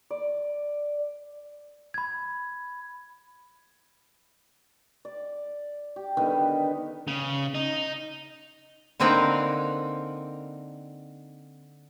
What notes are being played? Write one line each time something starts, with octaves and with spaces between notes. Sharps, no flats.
D5
B5 G#6
D5
G4
D3 D#3 G3 B3
C#3
D#4
D3 A#3 C4 D#4 A#4 B4